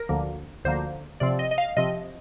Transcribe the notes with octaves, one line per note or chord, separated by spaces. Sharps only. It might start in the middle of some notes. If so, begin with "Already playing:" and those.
Already playing: A#4
D2 D3 F3 A#3
D2 D3 F3 A#3 C5
C3 F3 C4 D5
D#5
D#5
F5
C3 F3 C4 D#5